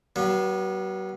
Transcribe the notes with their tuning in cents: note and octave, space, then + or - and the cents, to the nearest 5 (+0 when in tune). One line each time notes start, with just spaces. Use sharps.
F#3 +40 B3 -35